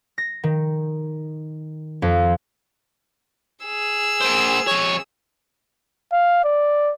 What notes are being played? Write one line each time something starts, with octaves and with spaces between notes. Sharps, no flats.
A#6
D#3
F2
G#4 E6
A#3 C5
F2 C#5
F5
D5